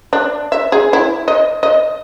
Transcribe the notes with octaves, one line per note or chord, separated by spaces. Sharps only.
D4
E5
G#4
E4
D#5
D#5